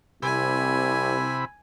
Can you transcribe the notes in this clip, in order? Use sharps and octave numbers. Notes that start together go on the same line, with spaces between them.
C2 C3 E4 G#5 B5